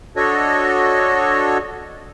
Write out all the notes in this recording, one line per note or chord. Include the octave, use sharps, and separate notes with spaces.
D4 F#4 A4 C#5 D#5